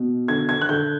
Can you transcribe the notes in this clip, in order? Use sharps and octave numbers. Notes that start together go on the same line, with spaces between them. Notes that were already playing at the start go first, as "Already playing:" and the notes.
Already playing: B2
D3 G#6
G#6
F#6
D3 G6